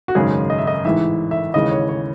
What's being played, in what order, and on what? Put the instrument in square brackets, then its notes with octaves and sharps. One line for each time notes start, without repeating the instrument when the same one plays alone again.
[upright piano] F#4
G#1 F#2 C#3 G#3 G#4
D#5
E5
D#5
A1 G#2 E3 G#3 E5
E5
D#2 C#3 E3 G#3 D#5
C#5
C#5